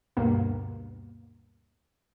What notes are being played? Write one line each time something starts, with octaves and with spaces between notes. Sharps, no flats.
D2 G2 B2 A#3